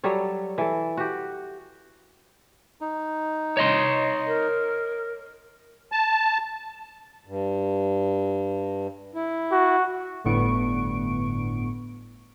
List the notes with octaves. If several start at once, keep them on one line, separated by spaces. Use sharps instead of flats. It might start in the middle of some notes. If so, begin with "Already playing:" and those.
F#3 G3 A4 C#5
E3 A4
F#4 G4
D#4
C#5 D#5 C6
A#4
A5
G2
E4
F#4
G1 A2 D3 B3 C#6 D7